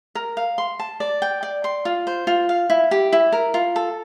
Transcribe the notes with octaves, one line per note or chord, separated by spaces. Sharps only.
A#4
F5
C6
A5
D5
G5
D5
C6
F4
C5
F4
F5
E4
G4
E4
A#4
F4
A4